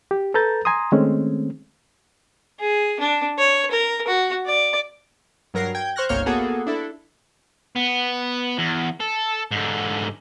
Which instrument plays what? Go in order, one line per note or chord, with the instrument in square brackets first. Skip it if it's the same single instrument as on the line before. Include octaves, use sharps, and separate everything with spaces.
[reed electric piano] G4
A4 B4 A#5 G6 A6
G#5 A#5 C6 D#6
D#3 G#3 A3 C4 C#4
[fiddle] G#4
D4
C#5
A#4
F#4
D5
[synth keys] G2 F#3 A#4 A#6 C7
G5 G6 G#6
C5 C#6 F6 F#6 A#6
G1 C2 A#3 C#5 F6 G6
A#3 B3 F#4 G#4 A4
D4 E4 A4
[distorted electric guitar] B3
E2
A4
G#2 D3